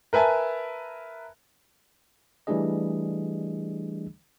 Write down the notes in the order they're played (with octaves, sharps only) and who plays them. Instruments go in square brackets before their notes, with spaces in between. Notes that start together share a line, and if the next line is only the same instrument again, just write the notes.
[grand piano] A#4 B4 E5 G#5 A5
[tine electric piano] E3 G3 A3 D4 G#4 D#5